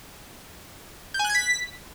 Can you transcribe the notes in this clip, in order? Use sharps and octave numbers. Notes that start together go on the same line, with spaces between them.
G6
G#5
F#6
G#6
B6